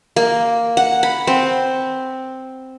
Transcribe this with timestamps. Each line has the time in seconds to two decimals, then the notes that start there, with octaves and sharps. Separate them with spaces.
0.16 A#3
0.77 F#5
1.03 B5
1.27 C4